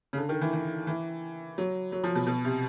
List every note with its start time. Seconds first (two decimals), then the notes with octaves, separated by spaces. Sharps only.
0.13 C#3
0.17 D3
0.29 D#3
0.41 E3
0.53 E3
0.87 E3
1.58 F#3
1.92 F#3
2.04 F3
2.15 B2
2.27 B2
2.45 C3